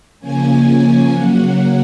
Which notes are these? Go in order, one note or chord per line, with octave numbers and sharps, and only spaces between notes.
C#3 F3 A#3 C#4 G#5
G#5
C#3 F#3 A#3 F#5